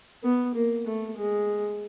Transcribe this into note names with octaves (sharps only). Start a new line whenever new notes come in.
B3
A#3
A3
G#3